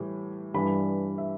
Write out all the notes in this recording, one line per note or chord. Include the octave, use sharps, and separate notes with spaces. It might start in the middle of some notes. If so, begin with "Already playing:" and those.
Already playing: A2 E3 G3
G2 E3 G3 D4 B5
E5